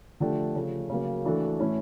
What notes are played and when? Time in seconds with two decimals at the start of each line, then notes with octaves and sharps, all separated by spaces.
0.20 D3 F3 A3 D4 G4
0.56 C#3 F3 A3
0.90 C#3 F#3 A#3
1.25 E3 A3 D4 F#4 A4
1.60 A2 E3 A3 C#4 E4